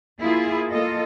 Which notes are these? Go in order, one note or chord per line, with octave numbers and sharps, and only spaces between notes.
A#3 E4 F4 G#4
A#3 F4 A4 D#5